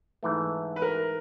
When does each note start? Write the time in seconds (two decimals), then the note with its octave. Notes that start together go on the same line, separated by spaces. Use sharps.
0.23 G#2 E3 A3
0.76 B4
0.82 A#4